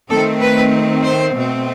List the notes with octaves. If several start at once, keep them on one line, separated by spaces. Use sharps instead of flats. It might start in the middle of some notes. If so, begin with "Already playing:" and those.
D#3 A3 C4 A4
B4
C5
B2 A3 C4